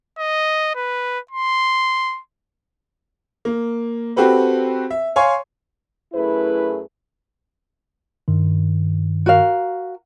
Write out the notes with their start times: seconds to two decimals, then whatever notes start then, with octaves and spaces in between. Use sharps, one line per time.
0.18 D#5
0.75 B4
1.31 C6
3.45 A#3
4.16 C4 F#4 G4 A4 B4 C5
4.90 E5
5.16 C#5 F5 G#5 C6 C#6
6.13 F#2 A3 E4 G#4 B4
8.28 G2 D#3
9.26 F#4 A#4 F5